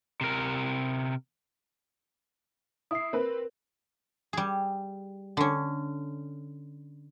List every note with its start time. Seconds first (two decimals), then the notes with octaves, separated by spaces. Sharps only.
0.21 C3 A#4
2.91 E4 D#6 C7
3.13 C4 A#4 B4
4.33 G3 G#4
5.37 D3 C#4